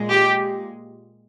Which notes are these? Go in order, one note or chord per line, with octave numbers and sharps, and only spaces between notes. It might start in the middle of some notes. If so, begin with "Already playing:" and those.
Already playing: A#2 G#3
G4